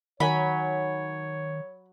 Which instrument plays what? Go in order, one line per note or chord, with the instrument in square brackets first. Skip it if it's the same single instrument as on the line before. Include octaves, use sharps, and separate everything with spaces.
[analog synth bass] D#3 [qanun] F#3 [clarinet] C#5 [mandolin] G#5 B5